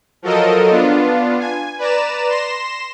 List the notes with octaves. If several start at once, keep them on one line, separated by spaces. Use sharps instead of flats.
F3 F#3 A4 A#4 D#5
B3 D4 F4
G#5
B4 D5 A#5 E7
C6 A#6 E7